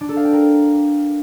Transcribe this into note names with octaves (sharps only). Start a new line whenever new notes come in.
D4
A4
F5
G5
A#4